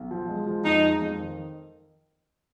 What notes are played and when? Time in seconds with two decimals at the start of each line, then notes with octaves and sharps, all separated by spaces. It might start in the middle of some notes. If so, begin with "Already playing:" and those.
Already playing: B1
0.11 F3
0.29 G#3
0.47 F3
0.65 F2 D#4
0.82 G#3
1.01 F2
1.20 D#3